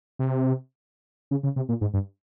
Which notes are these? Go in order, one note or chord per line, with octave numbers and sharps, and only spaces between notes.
C3
C#3
C#3
C3
A#2
G#2
G2